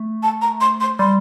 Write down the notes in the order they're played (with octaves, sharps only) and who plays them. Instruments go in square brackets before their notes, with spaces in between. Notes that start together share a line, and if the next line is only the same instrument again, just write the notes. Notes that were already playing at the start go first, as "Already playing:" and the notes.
Already playing: [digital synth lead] A3
[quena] A5
A#5
C6
C6
[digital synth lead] G3 [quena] C6